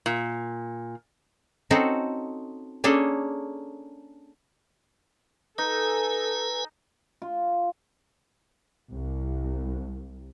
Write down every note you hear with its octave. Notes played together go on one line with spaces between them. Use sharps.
A#2
C4 C#4 D#4 F#4 A4 C5
A#3 C#4 D4 G#4 A4
D#4 A4 B4 G#5
F4
C2